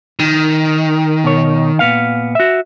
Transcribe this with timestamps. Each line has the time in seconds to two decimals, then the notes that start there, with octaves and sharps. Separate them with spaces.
0.20 D#3
1.24 B2 C#5
1.79 A#2 B3 F5
2.35 F#4 E5